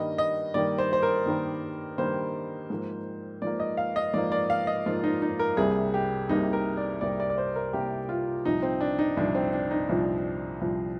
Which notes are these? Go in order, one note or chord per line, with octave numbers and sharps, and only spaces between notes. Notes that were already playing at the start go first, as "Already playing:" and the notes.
Already playing: G2 D#3 G3 A#3 D#5
D#5
G2 D#3 G3 A#3 D5
C5
C5
A#4
G2 D#3 G3 A#3
G2 D#3 G3 A#3 C5
G#2 F3 A#3
G#2 F3 A#3 D5
D#5
F5
D#5
G#2 F3 A#3 D5
D5
F5
D#5
G#2 F3 A#3 F4
D#4
D#4
A#4
C2 C3 G3 A#3 G#4
G4
C2 C3 G3 A#3 D#4
A#4
D5
C2 C3 G3 A#3 D5
D5
D5
C5
A#4
C2 C3 G3 A#3 G4
F4
C2 A#2 F3 D#4
C4
D4
D#4
C2 A#2 F3 D4
C4
D4
D#4
C2 A#2 F3
C2 A#2 F3